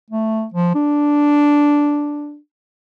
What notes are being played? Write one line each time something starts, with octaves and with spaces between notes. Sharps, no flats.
A3
F3
D4